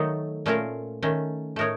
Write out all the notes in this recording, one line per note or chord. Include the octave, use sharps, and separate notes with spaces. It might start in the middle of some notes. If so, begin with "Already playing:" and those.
Already playing: D#3 F#3 A3 D#4 A4
A#2 A3 C#4 F4 A#4
D#3 A3 C#4
A2 A3 D#4 A#4 C#5